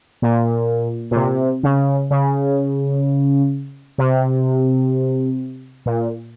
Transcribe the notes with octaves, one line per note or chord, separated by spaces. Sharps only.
A#2
A#2
C3
C#3
C#3
C3
A#2